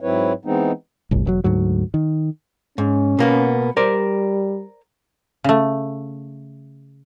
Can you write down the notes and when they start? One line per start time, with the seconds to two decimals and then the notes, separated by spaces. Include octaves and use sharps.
0.01 G#2 F#3 C4 E4 B4 C#5
0.45 E3 G#3 B3 C4 D#4
1.11 D1 G1 C2
1.25 E1 C3 F#3
1.44 D2 G#2 F#3
1.94 D#3
2.78 G#2 C#4
3.19 B2 A#3 B3
3.77 G3 A#4 C5 D5
5.44 C#3 A3